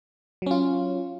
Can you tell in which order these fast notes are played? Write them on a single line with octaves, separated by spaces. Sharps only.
F#3 C#4 F4